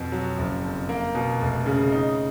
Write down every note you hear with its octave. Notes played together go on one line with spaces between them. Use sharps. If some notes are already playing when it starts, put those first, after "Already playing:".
Already playing: F2 B2
F#3
F#1
F2
A#3
B2
F1
C#3
D#4